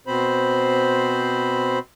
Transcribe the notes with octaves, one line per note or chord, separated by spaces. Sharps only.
B2 C4 C5 B5